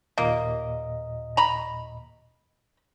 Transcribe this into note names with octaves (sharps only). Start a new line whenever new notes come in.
D#2 A#2 A#3 D#5
A#5 B5